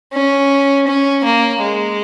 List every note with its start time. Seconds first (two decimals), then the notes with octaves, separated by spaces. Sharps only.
0.13 C#4
0.87 C#4
1.24 A#3
1.62 G#3